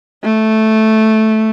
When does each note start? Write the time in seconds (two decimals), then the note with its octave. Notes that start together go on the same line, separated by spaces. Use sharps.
0.24 A3